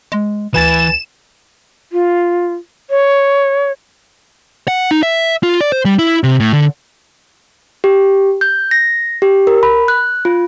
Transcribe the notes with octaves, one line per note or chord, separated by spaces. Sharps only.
G#3
D2 E3 B4 G#5 A6 E7
F4
C#5
F#5
D#4
E5
F4
D5
C5
G3
E4
C3
A2
D3
G4
G6
A#6
G4
A#4
B5
F#6
F4